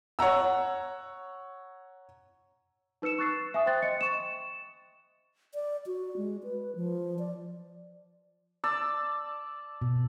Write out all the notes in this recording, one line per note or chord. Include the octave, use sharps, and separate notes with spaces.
C#5 F#5 A#5 E6
D#4 B4 E6 C#7 E7
C#6 F#6 A6 C7
E5 G#5 D#6
C5 G5 C6 D#6 F#6 A6
D#5 C#7
C#6 E7
D5
F#4
G#3
B4
F3
D5
D5 A5 E6
B2